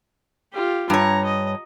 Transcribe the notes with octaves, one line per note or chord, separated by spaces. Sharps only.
F4 G4
G2 C#5 A#5
D#5